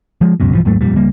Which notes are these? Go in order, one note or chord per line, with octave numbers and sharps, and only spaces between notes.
F3 G#3
G1 C#2 F#2 B2
B1 G2 E3 F3
D#2 G#2 F#3 A3
E1 F2 A#2 G3
C#2 G3 A#3